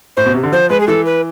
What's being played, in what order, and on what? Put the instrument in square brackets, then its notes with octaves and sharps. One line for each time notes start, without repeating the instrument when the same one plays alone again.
[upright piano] A2 [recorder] C5
[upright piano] B2
C3
D3
[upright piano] F3 [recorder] C5
[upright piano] G#3 [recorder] B4
[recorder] G#4
[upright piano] E3 [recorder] A4
[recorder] B4